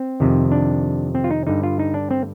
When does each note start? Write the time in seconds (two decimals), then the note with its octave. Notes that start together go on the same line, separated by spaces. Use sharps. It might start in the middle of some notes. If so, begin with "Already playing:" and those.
Already playing: C4
0.20 F2 C3 D#3
0.52 D4
1.15 C4
1.24 F4
1.31 D#4
1.47 G2 D3 D#4
1.63 F4
1.79 D#4
1.94 D4
2.11 C4